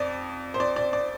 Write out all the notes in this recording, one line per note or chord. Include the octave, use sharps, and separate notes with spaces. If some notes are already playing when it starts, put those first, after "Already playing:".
Already playing: F2 D5
C5
D5
D5
D5